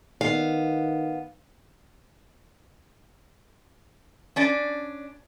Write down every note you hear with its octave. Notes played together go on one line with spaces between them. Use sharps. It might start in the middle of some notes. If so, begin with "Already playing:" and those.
D#3 B3 F5
C#4 D4 D5